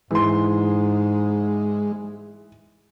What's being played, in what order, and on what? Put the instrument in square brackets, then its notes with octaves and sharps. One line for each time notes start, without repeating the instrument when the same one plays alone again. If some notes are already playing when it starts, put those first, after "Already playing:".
[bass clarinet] G#2 [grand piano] E3 C6 [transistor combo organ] G#3